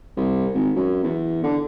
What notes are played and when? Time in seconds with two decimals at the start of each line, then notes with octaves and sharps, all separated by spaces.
0.17 C2
0.54 G#1
0.76 F#2
1.03 E2
1.44 D3